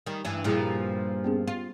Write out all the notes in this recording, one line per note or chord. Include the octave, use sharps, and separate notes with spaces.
D#3 G3
G2 E3 D4
G2 A#2 F3 G3 E4 G#4
B3 C#4 G#4
F4